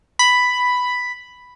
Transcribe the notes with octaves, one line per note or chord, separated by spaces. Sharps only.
B5